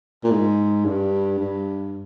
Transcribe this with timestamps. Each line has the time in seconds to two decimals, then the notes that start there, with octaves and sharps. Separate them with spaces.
0.24 A#2
0.31 G#2
0.85 G2
1.39 G2